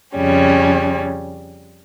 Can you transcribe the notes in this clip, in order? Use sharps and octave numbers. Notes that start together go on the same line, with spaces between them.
F2 C#3 G3 C#4